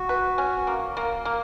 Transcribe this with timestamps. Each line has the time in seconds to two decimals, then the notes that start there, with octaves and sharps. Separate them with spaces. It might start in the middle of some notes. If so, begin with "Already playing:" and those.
Already playing: F#4
0.09 B4
0.38 C#4
0.67 A#3
0.97 A#3
1.25 A#3